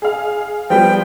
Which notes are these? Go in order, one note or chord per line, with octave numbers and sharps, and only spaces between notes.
G#4 F5
F3 G3 B3 G5